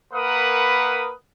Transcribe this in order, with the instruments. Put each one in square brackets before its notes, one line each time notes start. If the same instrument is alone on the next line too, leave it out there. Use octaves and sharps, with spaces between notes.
[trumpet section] A#3 A#4 B4 F#5 B5 D#6